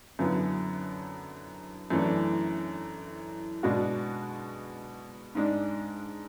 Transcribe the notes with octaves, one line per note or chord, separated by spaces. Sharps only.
F#2 D3 F#3 B3 E4
F#2 E3 A3 D4
B2 G#3 D4 F#4
G#2 G#3 D4